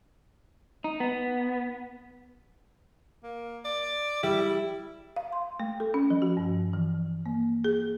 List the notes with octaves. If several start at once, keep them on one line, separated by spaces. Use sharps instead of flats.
D#4
B3
A#3
D5
G3 E4
F5
C6
A3
A4
C#4
F3
F#4
G2
E3
A#3
G#4